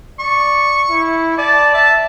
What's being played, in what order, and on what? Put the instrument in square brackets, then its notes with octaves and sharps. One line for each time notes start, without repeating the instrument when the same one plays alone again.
[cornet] D5 [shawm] C#6
[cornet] E4
[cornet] D5 [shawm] A5
[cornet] E5 [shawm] A5